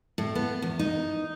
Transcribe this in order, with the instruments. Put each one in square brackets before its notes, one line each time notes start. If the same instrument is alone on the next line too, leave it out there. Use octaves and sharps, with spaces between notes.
[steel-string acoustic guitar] A2
B3
E2
D#4